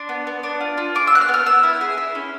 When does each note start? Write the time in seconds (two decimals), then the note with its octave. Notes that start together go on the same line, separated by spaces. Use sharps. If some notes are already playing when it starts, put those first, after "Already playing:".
Already playing: D4 C6
0.09 B3
0.27 B3
0.43 D4
0.61 F4
0.78 F4
0.95 G#4 D6
1.07 E6
1.12 B3 F#6
1.21 F6
1.29 B3
1.34 F6
1.46 B3 E6
1.63 E4
1.81 G#4
1.97 E4
2.15 C#4